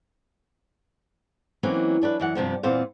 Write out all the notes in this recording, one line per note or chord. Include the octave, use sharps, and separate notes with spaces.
E3 F#3 A#3 C4 C#4 D#4
F#3 D4 E4 B4
F#2 E3 F#5
G2 C3 F3 B3
E2 A#2 B3 C4 C5 F5